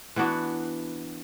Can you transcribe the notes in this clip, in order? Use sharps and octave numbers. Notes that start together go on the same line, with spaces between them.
E3 B3 D4 F#4